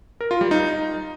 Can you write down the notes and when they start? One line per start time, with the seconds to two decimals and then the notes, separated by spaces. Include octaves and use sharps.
0.21 A#4
0.31 F4
0.41 G3
0.51 D#4